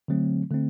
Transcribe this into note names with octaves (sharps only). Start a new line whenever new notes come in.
D3 F#3 A3 C4
D3 A3 C4